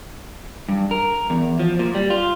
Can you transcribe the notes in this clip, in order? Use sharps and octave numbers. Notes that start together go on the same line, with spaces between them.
G2
A#4
E2
F3
A#2
G3
F4